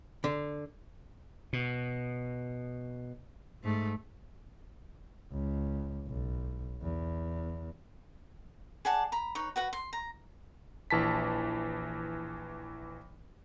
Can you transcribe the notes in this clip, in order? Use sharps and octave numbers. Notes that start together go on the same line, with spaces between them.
D3
B2
G#2 A3
C#2
B1
E2
G#4 D5 F#5 A5
A#5 B5
D#4 B4 C#5
F#4 B4 F#5
C6
A#5
A#1 E3 A5 B6